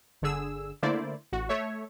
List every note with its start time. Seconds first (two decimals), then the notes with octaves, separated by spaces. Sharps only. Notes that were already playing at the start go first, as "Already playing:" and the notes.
0.22 G1 D3 G#4 E6
0.83 D3 A3 A#3 E4 C5 D5
1.32 A1 F#4
1.49 A3 C#5 E5